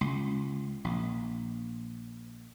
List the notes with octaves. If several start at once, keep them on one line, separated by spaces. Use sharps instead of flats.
C#2
A#1